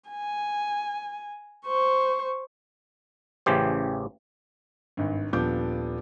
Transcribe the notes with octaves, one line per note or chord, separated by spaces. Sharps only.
G#5
C5 C#6
A1 C#3 E3 G4 C5
G#1 G2
D#1 F3 B3 D4 D6 G6